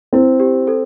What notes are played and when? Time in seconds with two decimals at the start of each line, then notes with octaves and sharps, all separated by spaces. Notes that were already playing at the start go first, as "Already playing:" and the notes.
0.13 C4 E4
0.40 G4
0.67 A4